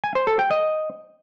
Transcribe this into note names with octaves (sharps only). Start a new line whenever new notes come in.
G#5
C5
A4
G5
D#5